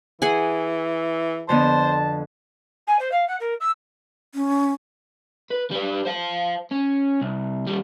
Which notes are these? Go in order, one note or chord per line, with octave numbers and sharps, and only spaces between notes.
E3 G#4 F#5 G#5
F2 D3 B3 C5 A5
G#5
C5
F5
F#5
A#4
E6
C#4
B4
G3 B4
C5 F5
C#4
C2
D#2 G3